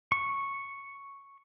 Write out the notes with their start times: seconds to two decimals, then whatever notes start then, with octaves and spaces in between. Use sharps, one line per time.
0.12 C#6